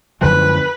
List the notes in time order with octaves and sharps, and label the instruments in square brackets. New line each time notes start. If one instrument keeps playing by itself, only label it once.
[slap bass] F#2 D3 F3 G#3 [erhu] B4